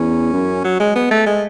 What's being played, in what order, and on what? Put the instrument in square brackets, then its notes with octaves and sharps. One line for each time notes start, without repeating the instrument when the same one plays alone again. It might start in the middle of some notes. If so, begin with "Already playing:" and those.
Already playing: [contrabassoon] E2 [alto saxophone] C#4
[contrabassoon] F#2
[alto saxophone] F#3
G#3
B3
A3
G#3